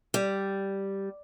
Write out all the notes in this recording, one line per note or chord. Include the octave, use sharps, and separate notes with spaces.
G3